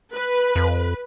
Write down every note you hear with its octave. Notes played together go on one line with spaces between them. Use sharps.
B4
F2